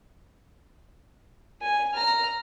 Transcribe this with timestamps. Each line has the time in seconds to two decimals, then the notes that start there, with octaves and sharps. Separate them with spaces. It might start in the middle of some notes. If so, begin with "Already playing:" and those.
1.62 G#5
1.94 A#5 F6